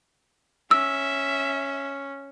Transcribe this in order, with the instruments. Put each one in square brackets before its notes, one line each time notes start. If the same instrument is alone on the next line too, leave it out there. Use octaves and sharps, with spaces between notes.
[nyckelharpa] C#4 [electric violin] E5 [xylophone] E6